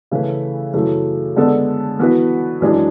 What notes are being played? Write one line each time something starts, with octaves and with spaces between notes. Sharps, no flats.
C#3 E3 A3 E4 B4
F#2 C#3 E3 A3
D3 G#3 B3 D4 A4
E3 B3 F#4 B4
F#2 E3 G#3 D4 G#4